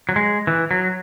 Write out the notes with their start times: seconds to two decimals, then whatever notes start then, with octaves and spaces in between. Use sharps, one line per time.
0.09 F#3
0.16 G#3
0.47 E3
0.71 F#3